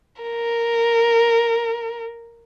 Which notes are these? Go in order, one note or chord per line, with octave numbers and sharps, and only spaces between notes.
A#4